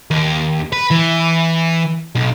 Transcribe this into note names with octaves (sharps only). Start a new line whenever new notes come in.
D#2
B4
E3
B1